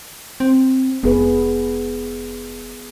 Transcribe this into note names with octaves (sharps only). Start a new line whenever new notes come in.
C4
F1 B3 G#4 B4